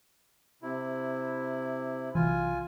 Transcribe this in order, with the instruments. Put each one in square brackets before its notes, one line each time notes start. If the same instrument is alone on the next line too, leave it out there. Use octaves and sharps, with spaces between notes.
[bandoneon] C3 E4
[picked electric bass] B1 C3 E3 [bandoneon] F4 G#5